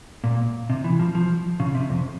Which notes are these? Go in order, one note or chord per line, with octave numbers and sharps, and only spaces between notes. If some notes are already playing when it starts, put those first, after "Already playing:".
A#2
C3
E3
F3
F3
C#3
C3
F2